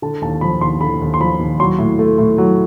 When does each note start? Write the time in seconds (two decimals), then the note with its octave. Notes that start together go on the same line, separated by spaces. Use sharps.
0.02 D3 A5
0.22 D#2 A5
0.41 F3 B5
0.61 D#2 C6
0.81 D3 B5
1.01 D#2
1.14 C6
1.20 F3 B5
1.40 D#2
1.59 F#3 C6
1.79 A2
1.99 A3
2.18 A2
2.38 F#3